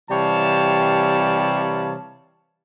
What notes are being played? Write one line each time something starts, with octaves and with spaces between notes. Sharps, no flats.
C3 E3 G3 C#5 F5 A5